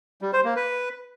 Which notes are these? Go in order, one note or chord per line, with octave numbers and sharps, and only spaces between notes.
G3
C5
A#3
B4